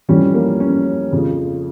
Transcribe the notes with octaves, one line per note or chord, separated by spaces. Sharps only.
F2 E3 G3 C#4
A#3
C#4
F2 C#3 F3